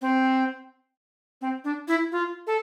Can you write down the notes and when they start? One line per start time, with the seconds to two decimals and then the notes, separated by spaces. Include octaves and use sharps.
0.02 C4
1.41 C4
1.64 D4
1.88 E4
2.12 F4
2.47 A4